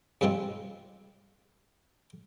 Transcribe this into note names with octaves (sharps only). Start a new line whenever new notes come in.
G2 C3 F3 G#3 C4